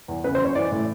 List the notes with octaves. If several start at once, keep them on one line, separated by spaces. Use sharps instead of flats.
E2
C#3 B4
C5
F#2
C#5
E3 D5
A2